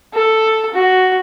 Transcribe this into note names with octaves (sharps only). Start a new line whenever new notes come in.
A4
F#4